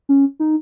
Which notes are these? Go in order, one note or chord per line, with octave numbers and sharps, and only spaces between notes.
C#4
D#4